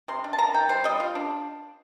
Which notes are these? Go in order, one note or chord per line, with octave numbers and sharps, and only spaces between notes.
C3 C6
D4
A5
A#3 A#5
D#3 G5
G3 C5
G3 D#5
F4
D4